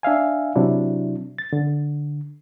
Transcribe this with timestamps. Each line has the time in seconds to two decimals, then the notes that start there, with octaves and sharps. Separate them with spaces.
0.03 D4 E5 F5 G#5
0.56 C3 F#3 D4 E4
1.38 A6
1.53 D3